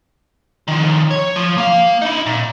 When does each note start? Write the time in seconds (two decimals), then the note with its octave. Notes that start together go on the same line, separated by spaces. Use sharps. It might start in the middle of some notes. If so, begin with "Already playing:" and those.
0.68 D#3 F3
1.11 C#5
1.36 F3
1.58 A#3 F5
2.02 D#4 E4
2.26 A#2